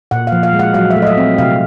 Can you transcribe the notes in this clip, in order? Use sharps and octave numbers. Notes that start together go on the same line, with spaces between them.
A#2 F#5
F5
F3
F5
G#3
F#5
F#3 F5
E5
A3
D#5
E5
C4
C3 F5